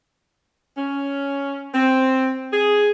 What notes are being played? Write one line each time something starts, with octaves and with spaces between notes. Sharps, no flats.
C#4
C4
G#4